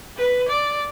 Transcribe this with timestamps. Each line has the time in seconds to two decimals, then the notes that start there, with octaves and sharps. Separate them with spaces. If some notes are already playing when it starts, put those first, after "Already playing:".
0.17 B4
0.49 D5